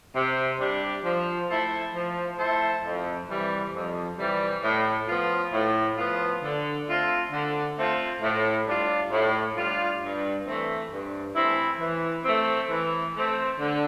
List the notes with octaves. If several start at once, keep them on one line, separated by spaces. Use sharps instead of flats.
C3
G3 D4 G4
F3
A3 E4 A4 C5
F3
A3 E4 A4 C5
F2
C3 E3 G3
F2
C3 E3 G3
A2
F3 B3 F4
A2
F3 B3 F4
D3
A3 C4 F4
D3
A3 C4 F4
A2
G3 D4 F4
A2
G3 D4 F4
G2
E3 A3 C4 E4
G2
E3 A3 C4 E4
E3
A3 C4
E3
A3 C4
D3